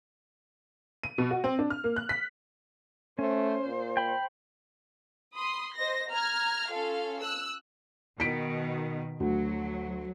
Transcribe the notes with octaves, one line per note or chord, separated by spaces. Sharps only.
D#7
B2
F#4
C4
D4
F6
A#3
F#6
B6
A3 C#4 C5
A#2
G5 B5
B5 C6 D#6
C5 D#5 A#6
A#5 F6 G#6
C#4 F4 A4 F5
E6 F#6
B2 D#3 B6 D7
D2 F#3